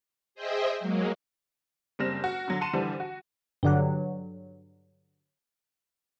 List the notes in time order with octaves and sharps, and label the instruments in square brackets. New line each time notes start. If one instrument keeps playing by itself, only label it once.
[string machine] G#4 C5 D#5 E5 G5
F#3 G#3 A#3
[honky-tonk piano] F#1 G3 C4 F6 A#6 E7
F#4
D3 F#3
F#5 A5 C6 D#7 E7
D3 E3 F3 G3
F#4
[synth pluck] G2 D3 F#3